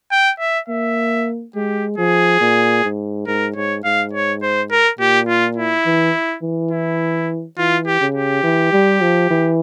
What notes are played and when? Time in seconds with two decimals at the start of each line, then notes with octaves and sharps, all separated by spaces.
0.12 G5
0.39 E5
0.68 A#3 E5
1.55 G#3 G4
1.98 F3 G#4
2.41 A#2
2.84 G#2
3.27 G#2 A#4
3.56 G#2 C#5
3.84 G#2 F5
4.13 C#5
4.42 C5
4.71 A#4
4.99 A#2 G4
5.28 F4
5.56 E4
5.86 E3
6.42 E3
6.71 E4
7.58 E3 F4
7.86 G4
8.01 C#3
8.14 G4
8.43 E3
8.73 G3
9.01 F3
9.30 E3